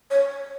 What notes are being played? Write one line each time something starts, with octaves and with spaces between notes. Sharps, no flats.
C#5